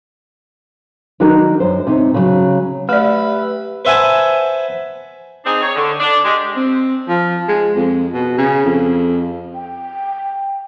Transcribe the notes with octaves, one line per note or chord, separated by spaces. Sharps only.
D#3 F#3 D4 D#4 F#4 A#4
F#2 C5
C3 D#4
C#3 E3 F#3
A3 G4 B4 D5 E5
B4 C5 E5 F#5 G#5 A5
C4 D4 D#4 G#4
C#5
D3
D4
G#3 G4
C4
F3
G#3
F2
B2
C#3
F2
G5